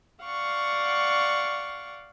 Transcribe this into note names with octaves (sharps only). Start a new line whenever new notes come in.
D5 F5 F#5 C#6